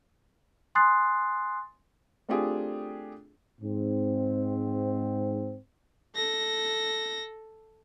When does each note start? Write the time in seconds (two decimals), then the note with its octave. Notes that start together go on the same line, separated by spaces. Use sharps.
0.75 G#5 C6 D#6 F#6 A6 C7
2.29 A3 C4 D4 F4 G4 G#4
3.61 G#2 C4
6.16 A4 A#6